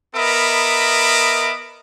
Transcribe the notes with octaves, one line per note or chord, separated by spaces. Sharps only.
B3 A#4 D#5 E5 B5 D6